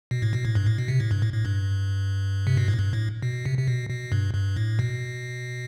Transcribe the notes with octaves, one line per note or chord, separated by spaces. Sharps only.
B2
A2
B2
A2
G2
A2
B2
C3
A2
G2
A2
A2
G2
C3
B2
A2
G2
A2
B2
C3
C3
B2
B2
G2
G2
A2
B2